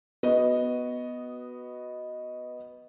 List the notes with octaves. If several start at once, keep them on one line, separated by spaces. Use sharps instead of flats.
B3 F#4 D#5